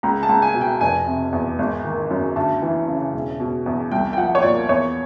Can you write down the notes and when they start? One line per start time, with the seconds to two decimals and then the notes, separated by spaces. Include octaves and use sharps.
0.03 C#2 A#5
0.23 A5
0.29 C#2
0.42 G#5
0.55 B2
0.61 G5
0.81 F1 G#5
1.07 C3
1.32 E2
1.59 G#1
1.85 D#3
2.10 F#2
2.36 D2 A5
2.62 E3
2.88 C#3
3.13 E1
3.40 B2
3.66 E2
3.91 C2 G5
4.13 G5
4.17 F3 F#5
4.35 C#5
4.43 A#2 D5
4.69 E2 C#5